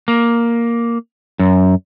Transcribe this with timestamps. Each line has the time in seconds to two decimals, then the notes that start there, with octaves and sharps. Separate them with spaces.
0.08 A#3
1.39 F#2